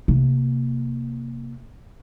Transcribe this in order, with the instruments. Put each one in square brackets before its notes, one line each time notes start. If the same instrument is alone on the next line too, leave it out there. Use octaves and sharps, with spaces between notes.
[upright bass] C3 A#3